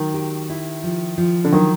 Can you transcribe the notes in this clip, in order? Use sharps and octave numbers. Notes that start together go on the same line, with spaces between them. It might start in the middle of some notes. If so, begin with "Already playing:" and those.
Already playing: D#3 F#3
G4
E4
F3
F3
D3
D#3 F#3